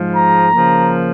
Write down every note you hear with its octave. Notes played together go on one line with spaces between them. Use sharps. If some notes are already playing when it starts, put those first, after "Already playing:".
Already playing: G#2 F3 G#3
A#5
C#3 F3 A#3